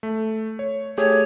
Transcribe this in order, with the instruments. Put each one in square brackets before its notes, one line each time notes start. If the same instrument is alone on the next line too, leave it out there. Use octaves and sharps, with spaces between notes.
[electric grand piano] A3
C#5
[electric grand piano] A3 G4 G#4 [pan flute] C#5